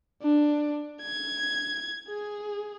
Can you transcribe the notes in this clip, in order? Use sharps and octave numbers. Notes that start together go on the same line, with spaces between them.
D4
G#6
G#4